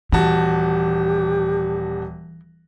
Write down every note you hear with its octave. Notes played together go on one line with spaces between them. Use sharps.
D#1 E3 F#4 G4 A5